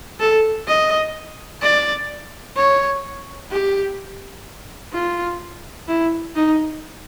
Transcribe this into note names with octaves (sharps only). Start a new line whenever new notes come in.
A4
D#5
D5
C#5
G4
F4
E4
D#4